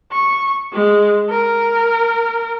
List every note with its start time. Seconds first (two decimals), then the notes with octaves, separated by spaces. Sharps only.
0.12 C#6
0.73 G#3
1.29 A#4